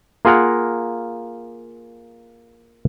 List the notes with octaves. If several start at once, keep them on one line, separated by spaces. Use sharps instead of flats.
A#3 F4 G#4 A#4 F#5 A#5